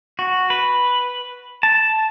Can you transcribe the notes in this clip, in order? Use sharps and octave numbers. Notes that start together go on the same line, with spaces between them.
F#4
B4
A5